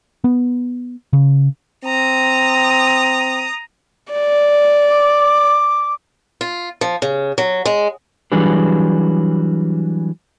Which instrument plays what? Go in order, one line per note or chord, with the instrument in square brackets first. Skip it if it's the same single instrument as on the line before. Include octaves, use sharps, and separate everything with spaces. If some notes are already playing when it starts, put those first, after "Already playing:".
[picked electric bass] B3
C#3
[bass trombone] C4 [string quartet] A#5 D#6
[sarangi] D5
[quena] D6
[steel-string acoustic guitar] F4
F3
C#3
F#3
G#3
[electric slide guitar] E3 F#3 G3 D4 G#4 B4